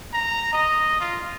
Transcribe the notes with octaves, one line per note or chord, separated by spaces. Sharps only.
A#5
D#5
F4